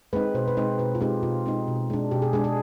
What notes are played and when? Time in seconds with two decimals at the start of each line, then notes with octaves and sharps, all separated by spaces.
0.13 G#3 C4 D#4 B4
0.34 B2 C5
0.48 B4
0.57 G#3 C4 D#4 C5
0.79 B2 B4
0.95 F4
1.01 G#3 C4 D#4 G4
1.23 B2 F4
1.46 G#3 C4 D#4
1.67 B2
1.90 G#3 D4
2.11 B2 G4
2.22 G#4
2.33 G#3 D4 G#4
2.44 G#4